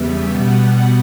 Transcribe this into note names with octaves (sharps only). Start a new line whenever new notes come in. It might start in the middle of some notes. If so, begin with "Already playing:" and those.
Already playing: E2 C#3 G3 B3 E5
B2 G3 B3 F#5